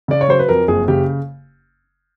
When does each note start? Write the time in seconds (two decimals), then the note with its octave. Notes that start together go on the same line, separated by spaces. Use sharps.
0.08 C#3 D5
0.21 C#5
0.28 F#3 C5
0.39 B4
0.49 F2 A#4
0.68 F#1 G#4
0.88 C#3 G4